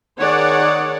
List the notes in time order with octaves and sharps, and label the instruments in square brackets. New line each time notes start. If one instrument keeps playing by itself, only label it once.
[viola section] D#3 G#4 C#5 D5 F#5